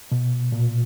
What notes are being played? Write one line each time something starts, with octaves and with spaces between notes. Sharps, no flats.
B2
A#2